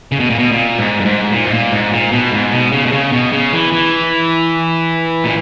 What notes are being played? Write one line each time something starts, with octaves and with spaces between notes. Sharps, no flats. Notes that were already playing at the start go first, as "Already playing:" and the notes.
C#3
B2
A#2
B2
A#2
G#2
G2
G#2
A#2
G#2
A#2
G#2
A#2
B2
G#2
B2
C#3
B2
C#3
B2
C#3
E3
E3
A#2